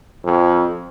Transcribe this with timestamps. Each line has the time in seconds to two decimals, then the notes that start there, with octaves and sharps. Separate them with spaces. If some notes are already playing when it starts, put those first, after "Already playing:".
0.24 F2